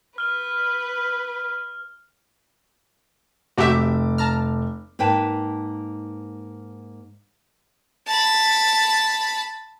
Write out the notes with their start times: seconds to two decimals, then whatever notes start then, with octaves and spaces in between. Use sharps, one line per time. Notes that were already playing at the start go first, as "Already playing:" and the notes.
0.18 B4 F6 G7
3.58 F1 F#4 G4 E5 D6
4.18 A5 A#5 F6
4.99 G#2 A#3 B4 G5 A5
8.07 A5 B5